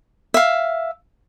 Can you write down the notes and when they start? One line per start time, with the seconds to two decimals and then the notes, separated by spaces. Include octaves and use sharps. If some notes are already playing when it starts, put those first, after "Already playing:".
0.34 E5 F5